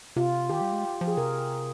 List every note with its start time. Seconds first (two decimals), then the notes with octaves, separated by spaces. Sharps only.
0.16 C3 F4
0.50 D#3 G4
0.61 G3
0.73 G#3
1.01 F3
1.08 G#4
1.17 C3 A#4